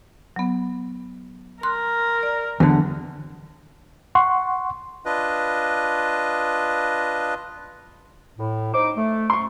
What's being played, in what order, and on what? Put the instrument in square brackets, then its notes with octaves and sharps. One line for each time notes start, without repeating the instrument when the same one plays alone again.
[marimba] F#3 B3
[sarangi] A#4 [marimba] C6 F#6
[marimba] D5
[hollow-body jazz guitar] E2 D3 [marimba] F#3
[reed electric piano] F#5 C6 C#6
[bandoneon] D4 F4 B4 D#5
[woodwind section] A2
[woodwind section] D#4 D6 [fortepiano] C5
[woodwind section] A3
[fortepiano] C6 C#6